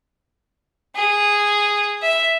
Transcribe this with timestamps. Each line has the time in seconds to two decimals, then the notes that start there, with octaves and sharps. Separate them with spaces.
0.96 G#4
2.02 E5